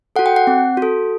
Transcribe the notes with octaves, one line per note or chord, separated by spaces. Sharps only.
F#4 A4 F#5
G5
F#5
C4
F#4 A4